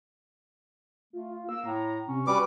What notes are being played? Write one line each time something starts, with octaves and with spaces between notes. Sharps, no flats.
A3 F4
A#3 E6
A2 A#5
C3 C#4
G3 C#4 F#4 B4 D6